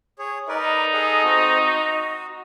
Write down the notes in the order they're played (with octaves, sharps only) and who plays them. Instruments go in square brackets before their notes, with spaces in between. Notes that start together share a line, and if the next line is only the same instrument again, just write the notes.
[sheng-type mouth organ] G#4 C#5
[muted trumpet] D#4 [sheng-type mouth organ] A#4 B4 D5
[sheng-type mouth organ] G#4 A4 F#5
C4 F#4
F#4